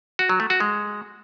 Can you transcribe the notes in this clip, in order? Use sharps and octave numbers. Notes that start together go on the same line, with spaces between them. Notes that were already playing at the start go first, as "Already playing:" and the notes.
F#4
F#3
A3
F#4
G#3